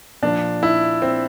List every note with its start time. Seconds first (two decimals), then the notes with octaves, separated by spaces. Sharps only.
0.22 A#2 F3 D4
0.63 E4
1.02 C4